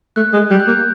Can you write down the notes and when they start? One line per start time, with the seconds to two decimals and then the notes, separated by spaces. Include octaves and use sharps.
0.16 A3 F#6
0.33 G#3
0.51 G3 G6
0.60 F#6
0.67 A#3
0.70 G6